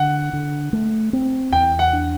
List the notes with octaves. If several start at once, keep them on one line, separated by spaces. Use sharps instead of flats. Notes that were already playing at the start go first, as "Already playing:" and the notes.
Already playing: D3 F#5
D3
A3
C4
E2 G5
F#5
D4